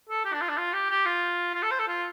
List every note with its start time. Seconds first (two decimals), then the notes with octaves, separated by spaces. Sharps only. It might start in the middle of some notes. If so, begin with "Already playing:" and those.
0.09 A4
0.25 G4
0.33 D4
0.41 F4
0.49 D4
0.57 F4
0.73 G4
0.90 G4
1.06 F4
1.54 F4
1.63 A4
1.71 C5
1.79 A4
1.88 F4